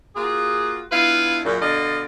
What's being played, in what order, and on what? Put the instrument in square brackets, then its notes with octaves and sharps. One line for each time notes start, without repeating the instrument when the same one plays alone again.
[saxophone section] A#3 F4 F#4 G#4
B3 D4 E4 F4 B4 F5
F#2 A#2 C#3
B2 D3 D5 D#5 F5